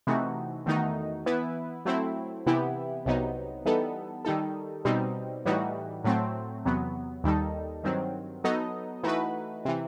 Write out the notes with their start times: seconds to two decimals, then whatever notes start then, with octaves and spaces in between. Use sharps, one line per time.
0.07 C3 E3 A3 D#4 F#4
0.66 E2 D#3 A3 D#4 F#4
1.26 E3 B3 E4 B4
1.85 F#3 A3 C4 E4
2.46 C3 E3 B3 E4 G4
3.06 C2 C3 F#3 B3 D#4
3.65 E3 G3 B3 D#4 A4
4.25 D#3 G3 D#4 A4
4.85 B2 G3 C4 D#4
5.45 A2 E3 G3 D#4 F#4
6.04 A2 F#3 A3 C4
6.65 E2 C3 F#3 B3
7.24 D#2 D#3 G3 D#4 A4
7.84 G2 D#3 F#3 C4
8.44 F#3 B3 D#4 A4 D#5
9.03 E3 A3 D#4 F#4 B4
9.65 C3 E3